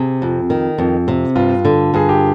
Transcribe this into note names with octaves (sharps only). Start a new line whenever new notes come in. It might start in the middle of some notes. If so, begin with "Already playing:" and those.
Already playing: C3 G#4
F2
D#3
F2
C3
G2 F4
D3
G2 G#4
G4